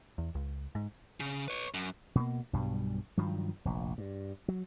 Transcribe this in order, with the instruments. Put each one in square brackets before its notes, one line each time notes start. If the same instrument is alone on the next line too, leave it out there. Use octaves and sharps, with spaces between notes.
[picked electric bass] E2
C#2
G#2
[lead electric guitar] C#3
B4 C#5
F#2
[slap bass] B2 A3 A#3
B1 G2 B2 G3
G2 D#3 F3 F#3
F1 A#1
G2
F#3